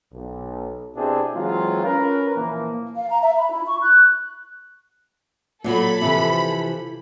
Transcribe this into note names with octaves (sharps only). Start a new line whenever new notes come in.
B1
B2 C4 D4 E4 G4 G#4
E3 F#3 G#3 C4 F4
C#4 A#4 B4
A#2 E3 F3 A#3
F5
A#5
E5
B5
E4
C#6
F#6
A#2 F#3 A4 B5
C3 E3 F3